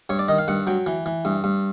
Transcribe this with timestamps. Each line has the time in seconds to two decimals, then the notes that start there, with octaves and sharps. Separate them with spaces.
0.09 G2 C#5
0.19 D5
0.28 D#3 D#5
0.38 F5
0.48 G2 F#5
0.67 F#3 G5
0.87 E3
1.06 E3
1.25 G2
1.44 G2